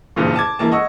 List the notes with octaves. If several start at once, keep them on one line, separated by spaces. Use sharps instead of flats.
F#1 E2 G2 A#2
A5 D6 G#6
E1 E3 A#3 A5
D#5 F#5 C#6 E6